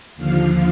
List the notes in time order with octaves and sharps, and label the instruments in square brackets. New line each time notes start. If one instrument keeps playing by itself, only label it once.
[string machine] D#2 D3 F3 F5